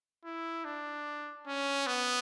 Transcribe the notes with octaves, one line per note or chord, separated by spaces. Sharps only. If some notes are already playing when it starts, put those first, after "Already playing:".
E4
D4
C#4
B3